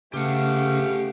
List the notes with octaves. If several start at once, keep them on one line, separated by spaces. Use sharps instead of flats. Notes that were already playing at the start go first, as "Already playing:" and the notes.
C#3 A3 G4 G#4 B4 F5 F#5